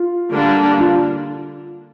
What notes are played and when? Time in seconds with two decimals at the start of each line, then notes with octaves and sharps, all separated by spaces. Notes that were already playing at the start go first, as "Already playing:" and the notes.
Already playing: F4
0.32 D3 G3 A#3 D4
0.79 F4